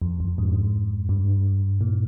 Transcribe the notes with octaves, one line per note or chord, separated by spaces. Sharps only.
F2
F2
G#2
G2
A#2